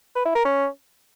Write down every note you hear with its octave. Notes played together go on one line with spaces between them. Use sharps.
B4
E4
A#4
C#4